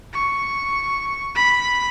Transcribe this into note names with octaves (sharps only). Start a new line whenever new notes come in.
C#6
B5